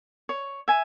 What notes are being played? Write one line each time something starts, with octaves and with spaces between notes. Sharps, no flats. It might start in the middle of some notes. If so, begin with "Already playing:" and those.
C#5
E5 G#5